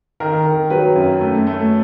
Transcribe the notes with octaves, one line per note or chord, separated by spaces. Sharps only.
D#3 A#4
D#3
F#3 B4
F#2
A3
A3